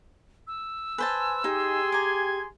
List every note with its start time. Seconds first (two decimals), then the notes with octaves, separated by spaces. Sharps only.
0.47 E6
0.98 B4 C5 G#5 A5
1.44 D#4 G4 G#4 G#5 C6
1.92 A#5 D6 G#6